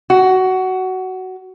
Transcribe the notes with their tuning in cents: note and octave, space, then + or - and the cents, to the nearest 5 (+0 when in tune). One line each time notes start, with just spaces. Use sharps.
F#4 +15